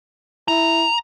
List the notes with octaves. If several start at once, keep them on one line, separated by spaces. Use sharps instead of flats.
E4 A#5